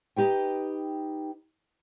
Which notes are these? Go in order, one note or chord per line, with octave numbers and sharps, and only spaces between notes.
D#4 G4 B4 G5